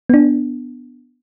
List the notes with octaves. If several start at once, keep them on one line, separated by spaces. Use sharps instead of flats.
B3 D4